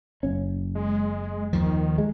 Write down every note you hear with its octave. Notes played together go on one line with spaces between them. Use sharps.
F#1 C#4
G#3
D#2 D#3 F3
G#3